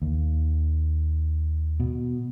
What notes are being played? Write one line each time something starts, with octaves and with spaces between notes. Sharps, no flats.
D#2
B2